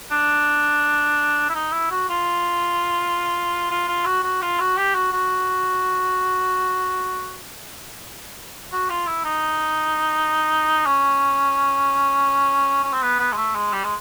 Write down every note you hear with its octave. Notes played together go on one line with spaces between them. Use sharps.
D4
E4
D#4
E4
F#4
F4
F4
F4
F#4
F#4
F4
F#4
G4
F#4
F#4
F#4
F4
E4
D#4
C#4
C#4
C4
B3
B3
G#3
A3
G#3
G3
G#3